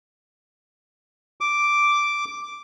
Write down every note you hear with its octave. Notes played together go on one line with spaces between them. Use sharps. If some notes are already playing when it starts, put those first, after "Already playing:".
D6